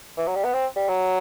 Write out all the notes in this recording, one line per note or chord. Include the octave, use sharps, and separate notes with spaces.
E3
F#3
G3
B3
C4
G3
F#3